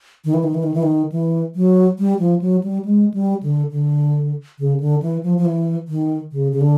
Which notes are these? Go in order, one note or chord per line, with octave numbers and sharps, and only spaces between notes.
D#3
E3
D#3
E3
D#3
E3
D#3
E3
F#3
G3
F3
F#3
G3
G#3
G3
D3
D3
C#3
D3
E3
F3
F3
E3
D#3
C#3
C#3
D3